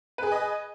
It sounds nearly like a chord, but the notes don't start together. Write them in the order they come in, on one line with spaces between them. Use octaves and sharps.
B4 G#4 G#5 D#5